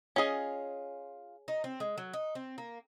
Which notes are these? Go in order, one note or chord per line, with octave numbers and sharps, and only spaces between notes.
C#4 F4 G#4 D#5
D#4
C4
G#3
F#3
D#4
C4
A#3